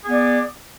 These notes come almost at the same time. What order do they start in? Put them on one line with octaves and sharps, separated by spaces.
G#4 B3 D5